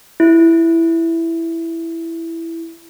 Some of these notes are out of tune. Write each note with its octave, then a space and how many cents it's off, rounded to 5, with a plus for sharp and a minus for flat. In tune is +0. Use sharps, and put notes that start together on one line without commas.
E4 +5